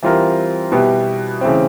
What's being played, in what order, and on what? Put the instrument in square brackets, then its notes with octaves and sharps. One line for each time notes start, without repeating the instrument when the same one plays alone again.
[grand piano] E3 G3 C4 F4 A#4
B2 G3 B3 E4 G4
C#3 E3 A3 C4